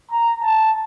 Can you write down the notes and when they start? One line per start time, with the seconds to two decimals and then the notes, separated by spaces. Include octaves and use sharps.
0.11 A#5
0.42 A5